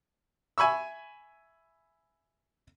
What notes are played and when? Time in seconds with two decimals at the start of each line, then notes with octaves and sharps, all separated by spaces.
0.58 E5 G#5 B5 C#6 E6